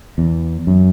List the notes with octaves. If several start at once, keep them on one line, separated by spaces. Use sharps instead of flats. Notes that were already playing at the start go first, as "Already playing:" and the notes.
E2
F#2